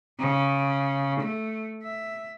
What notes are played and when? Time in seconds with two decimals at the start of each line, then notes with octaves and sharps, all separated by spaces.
0.20 C#3
1.20 A3
1.84 E5